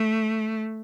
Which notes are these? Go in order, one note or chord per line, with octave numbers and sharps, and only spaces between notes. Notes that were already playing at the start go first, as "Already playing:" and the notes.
Already playing: A3